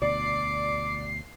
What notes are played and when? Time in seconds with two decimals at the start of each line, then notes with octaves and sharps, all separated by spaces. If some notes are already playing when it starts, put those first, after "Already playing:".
0.02 D2 B2 D5 D6 C7